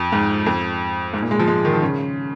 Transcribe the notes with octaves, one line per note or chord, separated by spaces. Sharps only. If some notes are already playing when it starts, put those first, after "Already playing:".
Already playing: F2
G#2
F2
G#2
A#2
G#3
F3
G#3
D#3
F3
C#3